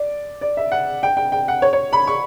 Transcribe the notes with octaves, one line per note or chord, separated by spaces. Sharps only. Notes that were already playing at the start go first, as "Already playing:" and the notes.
Already playing: D5
D5
E5
F#5
G5
G5
G5
F#5
C#5
C#5
B5
C#6